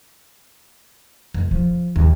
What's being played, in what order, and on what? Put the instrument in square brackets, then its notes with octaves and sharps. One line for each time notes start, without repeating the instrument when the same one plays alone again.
[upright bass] F1
F3
D#2